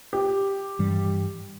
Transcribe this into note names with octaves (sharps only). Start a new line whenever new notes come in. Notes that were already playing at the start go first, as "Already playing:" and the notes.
G4
G2 E3 G3